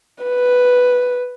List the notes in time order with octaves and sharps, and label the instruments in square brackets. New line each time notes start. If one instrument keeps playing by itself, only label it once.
[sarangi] B4